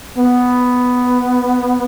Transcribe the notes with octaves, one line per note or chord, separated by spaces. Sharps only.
B3